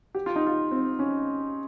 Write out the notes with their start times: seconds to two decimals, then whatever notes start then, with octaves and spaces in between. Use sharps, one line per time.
0.15 G4
0.26 F4
0.36 D#4
0.47 F4
0.71 C4
0.99 C#4